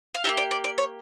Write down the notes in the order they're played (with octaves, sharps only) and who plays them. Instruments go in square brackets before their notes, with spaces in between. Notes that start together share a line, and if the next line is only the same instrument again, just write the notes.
[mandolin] F5
A#3 D#4 G4 E5
D5
D5
D5
C#5